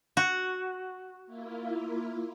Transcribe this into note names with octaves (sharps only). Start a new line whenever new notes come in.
F#4
A#3 E4 F4